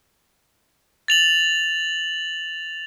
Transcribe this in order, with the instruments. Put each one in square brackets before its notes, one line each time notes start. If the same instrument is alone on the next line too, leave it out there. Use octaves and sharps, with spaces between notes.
[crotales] A6 F7 F#7